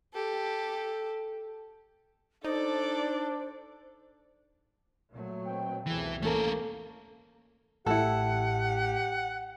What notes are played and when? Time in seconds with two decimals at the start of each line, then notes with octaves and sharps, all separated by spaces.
0.13 G4 A4
2.44 D4 D#4 A4 C5 D5
5.12 A#2 F#3 A3
5.46 B2 C4 G5
5.87 C2 F2 B2 E3 A3 G#4 B4
6.23 A3 A#3 C#4 A4 A#4
7.86 A1 A2 E4 G4 A4 F#5